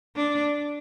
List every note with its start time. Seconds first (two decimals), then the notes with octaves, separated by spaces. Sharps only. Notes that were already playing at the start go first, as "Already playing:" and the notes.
0.16 D4